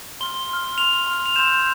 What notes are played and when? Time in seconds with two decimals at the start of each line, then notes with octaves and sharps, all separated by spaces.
0.21 C6 F6 G7
0.49 C6 F6
0.77 C6 F6 F7
1.07 C6 F6
1.26 F7
1.36 C6 E6 G6 E7